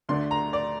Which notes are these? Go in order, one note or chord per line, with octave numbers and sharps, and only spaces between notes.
D2 D3 A3 D4 C6
A#5
D5